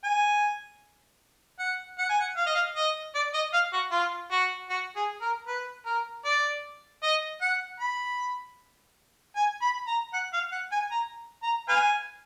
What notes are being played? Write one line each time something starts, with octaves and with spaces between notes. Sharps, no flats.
G#5
F#5
F#5
G#5
F#5
F5
D#5
F5
D#5
D5
D#5
F5
F#4
F4
F#4
F#4
G#4
A#4
B4
A#4
D5
D#5
F#5
B5
G#5
B5
A#5
F#5
F5
F#5
G#5
A#5
A#5
B4 F5 G#5